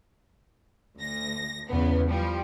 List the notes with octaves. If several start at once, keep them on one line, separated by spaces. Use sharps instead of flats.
D2 A#6
E2 C#3 B3
F3 G3